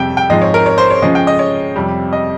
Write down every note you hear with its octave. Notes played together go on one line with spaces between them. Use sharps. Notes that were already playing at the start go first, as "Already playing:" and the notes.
Already playing: F2 C3 G3 G5
G5
G#2 F3 G#3 C4 D#5
C#5
A#4
C#5
C5
C#5
C#3 F3 G#3 C#4 D#5
G5
D#5
C#5
F2 C3 G3
D#5